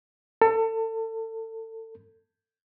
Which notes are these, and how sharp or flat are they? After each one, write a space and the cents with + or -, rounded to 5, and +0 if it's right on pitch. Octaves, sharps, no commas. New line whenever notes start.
A4 +30